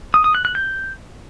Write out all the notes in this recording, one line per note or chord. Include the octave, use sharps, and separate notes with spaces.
D#6
D#6
F#6
F#6
G6